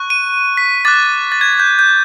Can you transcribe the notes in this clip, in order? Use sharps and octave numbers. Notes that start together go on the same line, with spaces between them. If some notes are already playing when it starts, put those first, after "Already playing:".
Already playing: C#6 F#6
D#7
B6
D6 F#6 A6
A6
G#6
G6
G6